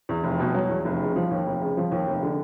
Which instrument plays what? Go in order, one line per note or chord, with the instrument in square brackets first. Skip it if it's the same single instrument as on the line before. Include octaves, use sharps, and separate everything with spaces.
[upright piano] E2
F1
B2
F#3
E2
F1
C#3
F3
D#2
F1
C#3
F3
D#2
F1
D3